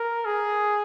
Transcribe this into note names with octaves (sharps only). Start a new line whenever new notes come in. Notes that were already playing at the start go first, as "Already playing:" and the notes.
Already playing: A#4
G#4